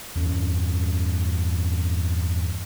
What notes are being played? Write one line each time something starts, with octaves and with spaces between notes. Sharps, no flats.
E2 G2 G3 C#4